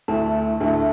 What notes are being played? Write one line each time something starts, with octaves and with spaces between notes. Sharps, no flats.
D2 D3 A3 E4 A5
D2 D3 A3 E4